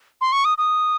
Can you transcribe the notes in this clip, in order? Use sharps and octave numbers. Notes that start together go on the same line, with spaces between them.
C6
C#6
D#6
D#6